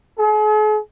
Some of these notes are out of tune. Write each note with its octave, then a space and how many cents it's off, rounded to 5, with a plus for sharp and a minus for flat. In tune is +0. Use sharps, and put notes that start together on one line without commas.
G#4 +45